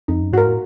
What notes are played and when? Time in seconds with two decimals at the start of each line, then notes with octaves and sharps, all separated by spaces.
0.08 F2 D#4
0.22 F#2
0.33 G#2 F#4 A#4
0.45 A2